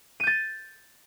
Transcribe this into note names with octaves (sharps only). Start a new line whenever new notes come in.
G6 A6 D#7